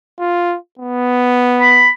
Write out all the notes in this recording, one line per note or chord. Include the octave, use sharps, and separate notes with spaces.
F4
B3
B5